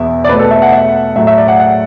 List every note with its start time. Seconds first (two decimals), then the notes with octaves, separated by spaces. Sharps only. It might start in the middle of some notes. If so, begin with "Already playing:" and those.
Already playing: E2 B2 B3 E5
0.24 D5
0.29 B2 B4
0.33 A3
0.39 A4
0.51 E5
0.62 F#5
0.72 E5
1.16 A2 F#3 A3 E5
1.27 E5
1.38 D5
1.48 F#5
1.59 F#5